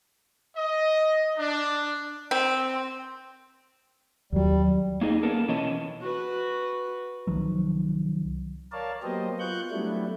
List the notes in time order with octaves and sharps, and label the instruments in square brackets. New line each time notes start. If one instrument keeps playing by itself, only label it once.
[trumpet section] D#5
D4
[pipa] C4
[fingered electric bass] D#2 F#3 [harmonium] G3
[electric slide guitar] A#3 D#4 G#4 D#5
A#3 B3 C#4 A4 A#4
B2 E3 C#4 C#5 D#5 A5
[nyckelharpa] F#4 B4
[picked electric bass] C2 D#3 F3 F#3
[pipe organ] A#4 C#5 D5 F5 A5
F#3 A#3 B3 G4 C5 D#5
B3 F4 C#6 F#6 G6
F#3 G3 A3 B3 D4 E4